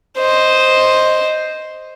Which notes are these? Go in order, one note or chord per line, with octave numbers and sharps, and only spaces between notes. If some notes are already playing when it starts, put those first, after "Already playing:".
C5 D#5